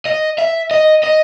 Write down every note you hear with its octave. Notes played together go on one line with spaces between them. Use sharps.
D#5
E5
D#5
D#5